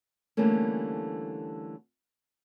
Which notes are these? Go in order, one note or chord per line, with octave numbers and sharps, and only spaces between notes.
D3 E3 G3 A3 A#3 C#4